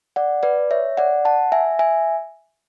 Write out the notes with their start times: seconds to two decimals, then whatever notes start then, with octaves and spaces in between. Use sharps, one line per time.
0.16 D5 F#5
0.43 B4 D5
0.71 C#5 E5
0.97 D5 F#5
1.25 F#5 A5
1.52 E5 G#5
1.79 E5 G#5